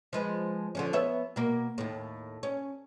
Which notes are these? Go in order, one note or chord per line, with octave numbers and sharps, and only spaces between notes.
F3 G#3 B4
D3 F3 C#4
B3 C#5 E5
B2 A#3
D#2 A2
C#4